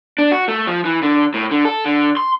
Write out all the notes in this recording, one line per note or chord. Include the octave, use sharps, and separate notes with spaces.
D4
F#4
A3
F3
E3
D3
A2
D3
A4
D3
C6